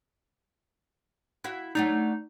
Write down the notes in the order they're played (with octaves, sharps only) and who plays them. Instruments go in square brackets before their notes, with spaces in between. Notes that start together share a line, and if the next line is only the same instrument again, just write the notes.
[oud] E4 F#4 F5
[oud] F#3 A3 D4 [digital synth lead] D#4